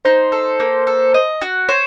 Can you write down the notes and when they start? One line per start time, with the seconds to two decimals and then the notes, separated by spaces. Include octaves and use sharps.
0.05 D#4 C5
0.32 A4
0.60 A#3
0.87 A4
1.14 D#5
1.42 F#4
1.69 C5 C#5